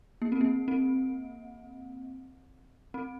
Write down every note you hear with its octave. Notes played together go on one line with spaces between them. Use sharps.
A#3
C4
A#3
C4
C4